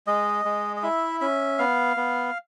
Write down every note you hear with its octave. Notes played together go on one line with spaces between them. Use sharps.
G#3 D#5
G#3
D#5
E4 E5
C#4 E5
B3 F5
B3